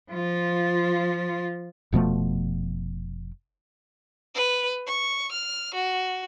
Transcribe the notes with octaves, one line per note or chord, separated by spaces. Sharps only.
F3 F4
F1 B2 F3 A3
B4
C#6
F6
F#4